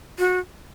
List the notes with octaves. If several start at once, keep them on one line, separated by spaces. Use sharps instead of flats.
F#4